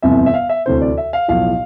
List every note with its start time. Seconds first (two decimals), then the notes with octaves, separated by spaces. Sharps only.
0.02 G1 F2 C3 E3 E5
0.26 E5
0.34 F5
0.49 E5
0.66 D2 C3 E3 C5
0.81 D5
0.97 E5
1.13 F5
1.28 B1 A2 F3 F5